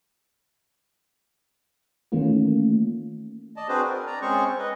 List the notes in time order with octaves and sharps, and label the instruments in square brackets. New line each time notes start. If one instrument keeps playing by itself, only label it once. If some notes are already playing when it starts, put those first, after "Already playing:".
[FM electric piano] D#3 E3 A3 A#3 C#4 F4
[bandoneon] D5 D#5 A5
C4 D4 F#4 G#4 B4 C5
A#4
D5 A#5
G#3 C4 C#4 G#4 C5 C#6
B4 D#5